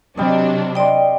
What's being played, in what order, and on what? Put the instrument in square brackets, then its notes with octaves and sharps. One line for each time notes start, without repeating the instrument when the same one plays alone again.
[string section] C3 F#3 D4 [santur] G3 D#5
[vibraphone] D5 G5 [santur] D#5 C6